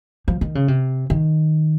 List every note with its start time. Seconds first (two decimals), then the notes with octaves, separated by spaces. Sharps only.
0.28 F3
0.41 D#3
0.55 C#3
0.68 C3
1.10 D#3